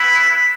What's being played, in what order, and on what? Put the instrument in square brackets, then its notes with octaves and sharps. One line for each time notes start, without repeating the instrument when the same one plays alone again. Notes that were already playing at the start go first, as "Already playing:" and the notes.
Already playing: [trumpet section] B3 E4 B5